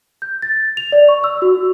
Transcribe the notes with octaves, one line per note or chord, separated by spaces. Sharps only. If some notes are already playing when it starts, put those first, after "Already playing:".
G6
A6
F7
D5
C#6
E6
F#4